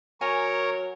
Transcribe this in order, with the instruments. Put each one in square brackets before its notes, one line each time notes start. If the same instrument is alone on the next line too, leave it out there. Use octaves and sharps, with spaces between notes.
[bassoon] F#3 [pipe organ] A#4 C#5 [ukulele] G#5